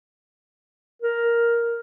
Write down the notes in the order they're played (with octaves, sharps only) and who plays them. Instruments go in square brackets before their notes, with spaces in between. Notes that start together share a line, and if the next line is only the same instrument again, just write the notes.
[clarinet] A#4